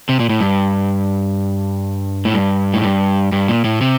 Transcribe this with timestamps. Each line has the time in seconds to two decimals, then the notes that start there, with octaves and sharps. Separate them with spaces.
0.09 C3
0.20 A#2
0.29 A2
0.41 G2
2.25 A2
2.34 G2
2.74 A2
2.84 G2
3.32 G2
3.48 A#2
3.64 A2
3.81 C3